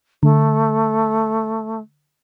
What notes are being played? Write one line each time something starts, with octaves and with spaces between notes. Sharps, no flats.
D3 A3